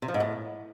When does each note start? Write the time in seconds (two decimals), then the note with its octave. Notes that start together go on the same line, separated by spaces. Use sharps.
0.02 C3
0.08 F3
0.14 G#2
0.20 A2